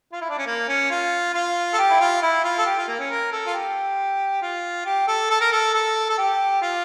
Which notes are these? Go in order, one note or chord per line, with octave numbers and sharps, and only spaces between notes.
F4
E4
D4
C#4
A#3
C#4
F4
F4
A4
G4
E4
F4
E4
F4
A4
G4
F4
A#3
C#4
A#4
A4
F4
G4
F4
G4
A4
A4
A#4
A4
A4
A4
G4
F4